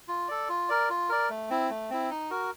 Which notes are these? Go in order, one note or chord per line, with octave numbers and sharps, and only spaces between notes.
F4
A4 D5
F4
A#4 D5
F4
A#4 D5
A3
C4 E4
A3
C4 E4
D#4
F#4 A#4